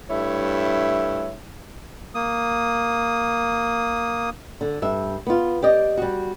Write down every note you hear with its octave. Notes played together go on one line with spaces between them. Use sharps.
G2 A3 E4 C#5 E5
A#3 D#6
D3
G2 E5
B3 F4
G4 D5 D#5
G3 F#4